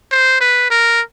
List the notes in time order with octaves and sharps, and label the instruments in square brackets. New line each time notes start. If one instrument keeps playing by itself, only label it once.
[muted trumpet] C5
B4
A#4